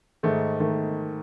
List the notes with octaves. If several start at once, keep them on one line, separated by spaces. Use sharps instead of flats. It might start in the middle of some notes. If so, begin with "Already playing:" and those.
G#2 D#3 A3
D#3 A3